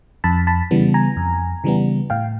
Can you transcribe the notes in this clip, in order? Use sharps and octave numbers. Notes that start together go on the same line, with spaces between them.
F2 A5 B5
A5 B5
C#3 E3 G3 B3
G#5 A#5
F2
C#3 E3 G3 B3
A2 F5 G5